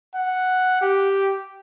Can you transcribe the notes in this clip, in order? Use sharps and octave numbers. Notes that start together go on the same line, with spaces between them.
F#5
G4